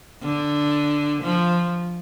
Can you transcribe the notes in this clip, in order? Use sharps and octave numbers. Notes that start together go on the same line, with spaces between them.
D3
F3